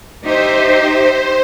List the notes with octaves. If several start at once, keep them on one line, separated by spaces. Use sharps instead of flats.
D#4 G4 C5 E5